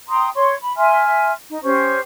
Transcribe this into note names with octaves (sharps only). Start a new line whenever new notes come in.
G5 A#5 C6 D#6
C#5 C6 C#6
B5
E5 G#5 C6 F6
D#4
C#4 G4 C5 C#6